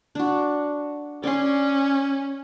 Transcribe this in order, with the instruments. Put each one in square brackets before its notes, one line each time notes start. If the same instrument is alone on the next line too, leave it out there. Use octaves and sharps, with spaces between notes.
[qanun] D4 F#4
[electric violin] C#4 [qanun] D5 C6